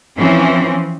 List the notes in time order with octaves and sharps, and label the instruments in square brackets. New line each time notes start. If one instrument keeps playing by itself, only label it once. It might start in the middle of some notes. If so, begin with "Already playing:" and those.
[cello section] E3 F3 C4 C#4